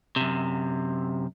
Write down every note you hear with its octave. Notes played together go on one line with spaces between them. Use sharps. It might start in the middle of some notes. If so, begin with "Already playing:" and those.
F#2 C3